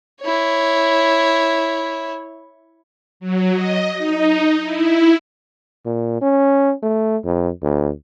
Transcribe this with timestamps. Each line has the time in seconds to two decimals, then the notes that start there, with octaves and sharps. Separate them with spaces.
0.21 E4 C#5
3.20 F#3
3.52 D#5
3.98 D#4
4.63 E4
5.86 A#2
6.22 C#4
6.83 A3
7.25 F2
7.62 D2